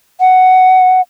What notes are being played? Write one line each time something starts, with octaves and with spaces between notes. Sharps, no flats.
F#5